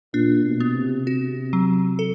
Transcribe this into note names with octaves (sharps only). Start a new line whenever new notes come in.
A#2 D4
B2
B3
C3
C3 F#4
F#3
A4